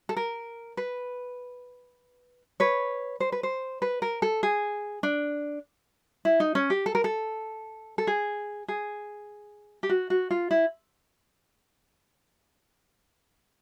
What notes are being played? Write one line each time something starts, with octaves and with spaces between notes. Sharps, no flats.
A4
A#4
B4
B4 C#5
C5
B4
C5
B4
A#4
A4
G#4
D4
E4
D#4
C#4
G4
A4
A#4
A4
A4
G#4
G#4
G4
F#4
F#4
F4
E4